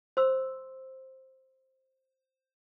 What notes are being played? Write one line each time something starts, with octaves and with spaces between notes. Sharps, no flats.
C5 C6 E6